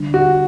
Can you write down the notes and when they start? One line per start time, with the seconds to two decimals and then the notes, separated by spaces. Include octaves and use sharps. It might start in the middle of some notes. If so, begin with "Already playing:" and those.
Already playing: D3 G3 D4
0.14 F#4